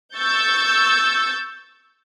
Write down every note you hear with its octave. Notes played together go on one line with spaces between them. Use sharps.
C#6 E6 G6 A6